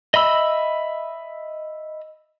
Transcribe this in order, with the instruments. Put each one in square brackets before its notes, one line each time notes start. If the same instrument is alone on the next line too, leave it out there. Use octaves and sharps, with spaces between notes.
[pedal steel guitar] D#5 E5 B5 E6